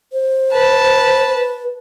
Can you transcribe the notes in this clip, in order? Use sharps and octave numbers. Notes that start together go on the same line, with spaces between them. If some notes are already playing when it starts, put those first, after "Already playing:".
C5
B4 A5
B4